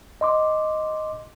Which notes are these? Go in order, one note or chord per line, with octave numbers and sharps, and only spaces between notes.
D#5 C6 D6